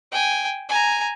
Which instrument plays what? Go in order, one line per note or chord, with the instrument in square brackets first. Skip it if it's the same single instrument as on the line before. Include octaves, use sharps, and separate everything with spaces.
[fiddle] G5 G#5
G#5 A#5